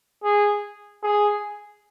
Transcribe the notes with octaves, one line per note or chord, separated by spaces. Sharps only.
G#4
G#4